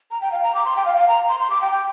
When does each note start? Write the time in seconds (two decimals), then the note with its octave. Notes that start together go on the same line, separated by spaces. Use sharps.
0.11 A#5
0.21 G5
0.32 F5
0.43 A#5
0.55 D6
0.65 C6
0.76 G5
0.86 F5
0.97 F5
1.08 A#5
1.29 C6
1.40 C6
1.50 D6
1.61 G5
1.72 G5